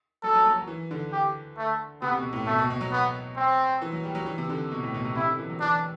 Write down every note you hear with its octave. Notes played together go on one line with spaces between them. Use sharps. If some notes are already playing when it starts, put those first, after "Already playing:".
F#3 A4
F#3
F#3
F#3
E3
D3
G4
A3
C3 B3
B2
A2
B2 A3
B2
B2
F#3
B3
C4
E3
F#3
G3
F#3
E3
C3
D3
B2
A2
B2
C3
C3 E4
D3
E3
F#3
E3 D4